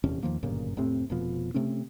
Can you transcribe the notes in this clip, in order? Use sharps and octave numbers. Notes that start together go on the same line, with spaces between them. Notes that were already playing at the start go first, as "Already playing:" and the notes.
D#1 E2 C3 C#4
E2 D#3 F3 A#3
G1 F#2 A#2 C#3
F1 A2 C3 C4
F1 B2 F3
C3 A3 C4 C#4